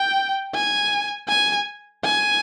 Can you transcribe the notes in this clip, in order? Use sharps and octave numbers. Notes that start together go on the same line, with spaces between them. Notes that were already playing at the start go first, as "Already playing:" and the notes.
Already playing: G5
G#5
G#5
G#5